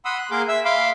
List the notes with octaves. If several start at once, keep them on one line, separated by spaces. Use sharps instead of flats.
F#5 B5 C6 D#6 E6
F#6
A#3 G#4 A#4 C6 D6
E5 E6
F5 B5 C6 D6